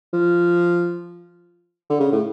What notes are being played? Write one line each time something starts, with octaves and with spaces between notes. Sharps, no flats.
F3
D3
C#3
A2